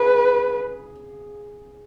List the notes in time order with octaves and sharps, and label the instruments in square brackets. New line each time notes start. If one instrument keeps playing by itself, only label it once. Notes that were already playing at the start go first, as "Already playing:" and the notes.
Already playing: [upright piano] G#4 [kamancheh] B4